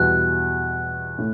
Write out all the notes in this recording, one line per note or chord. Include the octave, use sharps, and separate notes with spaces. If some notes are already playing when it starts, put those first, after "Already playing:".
Already playing: E2 B2 G3 B3 F#4 F#6
A2